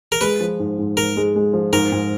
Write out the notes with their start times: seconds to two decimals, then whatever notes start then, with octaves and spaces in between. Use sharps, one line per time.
0.12 A#4
0.21 G#3 B4
0.40 F3
0.60 G#2
0.79 G#2
0.97 G#2 A#4
1.17 G#3
1.36 G#3
1.53 F3
1.73 G#2 A#4
1.92 G#2